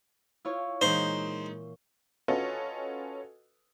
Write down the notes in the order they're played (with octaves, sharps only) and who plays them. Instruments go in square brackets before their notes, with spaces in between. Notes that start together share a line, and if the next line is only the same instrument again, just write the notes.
[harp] E4 F4 C#5
[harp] A#2 E3 [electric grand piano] G#3 D#4 [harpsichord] C5
[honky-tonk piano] C#4 F4 F#4 A4 B4 D#5